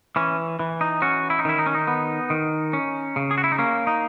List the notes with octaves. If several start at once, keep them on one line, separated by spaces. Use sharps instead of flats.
E3 C#4
E3
D#4
C#4 F#4
E4
D#4
D#3 E4
D#4
C#4
D#4
B3
D#3
C#4
C#3
G#4
F#4
E4
D#4
A#3 C#4
D#4